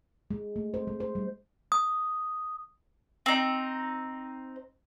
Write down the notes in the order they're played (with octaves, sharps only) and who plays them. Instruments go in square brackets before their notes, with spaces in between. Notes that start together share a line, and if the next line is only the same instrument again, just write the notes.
[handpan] G#3
A3
C5
G#3
C5
G3
[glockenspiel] D#6
[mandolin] C4 D#4